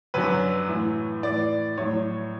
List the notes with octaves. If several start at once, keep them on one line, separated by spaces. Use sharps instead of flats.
F#2 D3 F#3 B4
A2 E3
A2 E3 D5
A2 F#3 C#5